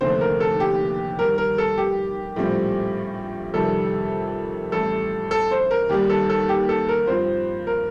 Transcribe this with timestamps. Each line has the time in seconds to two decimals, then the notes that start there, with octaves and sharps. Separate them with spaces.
0.01 F1 D#2 D3 A3 C4 C5
0.21 A#4
0.40 A4
0.60 G4
1.18 G2 D#3 G3 A#4
1.38 A#4
1.58 A4
1.78 G4
2.36 A#1 A2 G3 C4 F4
3.54 F2 C3 D#3 G3 A4
4.72 A1 A2 G3 A4
5.31 A4
5.51 C5
5.71 A#4
5.89 D#2 D#3 G3 G4
6.10 A4
6.30 A4
6.49 G4
6.69 A4
6.88 A#4
7.07 G2 F3 C4 F4 C5
7.67 A#4